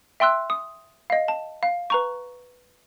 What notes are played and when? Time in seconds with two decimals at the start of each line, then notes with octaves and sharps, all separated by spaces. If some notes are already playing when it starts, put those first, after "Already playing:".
0.20 E5 G5 C6 E6 F#6
0.50 D#6
1.10 D#5 F5
1.28 A5
1.63 F5
1.90 B4 A#5 C#6